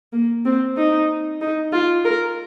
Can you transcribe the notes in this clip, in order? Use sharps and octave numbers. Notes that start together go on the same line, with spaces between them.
A#3
C4
D#4
D#4
F4
A#4